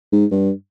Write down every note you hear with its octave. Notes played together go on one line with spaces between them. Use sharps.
G#2
G2